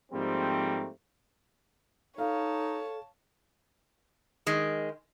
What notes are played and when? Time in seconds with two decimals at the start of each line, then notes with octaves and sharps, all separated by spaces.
0.12 G#2 F3 G3 A3 A#3 C4
2.18 D#4 A4 C#5 F5 A5
4.47 D#3 G#3